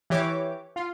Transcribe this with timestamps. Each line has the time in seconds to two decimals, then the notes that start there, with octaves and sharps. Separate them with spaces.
0.10 E3 G4 C#5 D6
0.76 F4